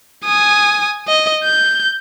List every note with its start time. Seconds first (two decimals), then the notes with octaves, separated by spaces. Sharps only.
0.25 G#5 D#6
1.08 D#5
1.44 G6